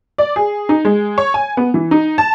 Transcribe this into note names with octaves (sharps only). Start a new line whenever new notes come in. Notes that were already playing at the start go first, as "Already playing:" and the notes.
D5
G#4
D#4
G#3
C#5
G#5
B3
E3
D#4
A5